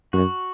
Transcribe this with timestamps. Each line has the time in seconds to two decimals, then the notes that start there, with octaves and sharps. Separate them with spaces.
0.13 F#2 F#4